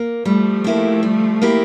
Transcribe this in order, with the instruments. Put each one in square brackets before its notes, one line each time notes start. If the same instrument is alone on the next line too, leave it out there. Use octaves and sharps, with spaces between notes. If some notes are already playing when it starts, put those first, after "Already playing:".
Already playing: [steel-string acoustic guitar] A#3
[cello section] F3 A3 [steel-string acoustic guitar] G3
[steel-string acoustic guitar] A#3 E4 G4
G3
A#3 E4 G4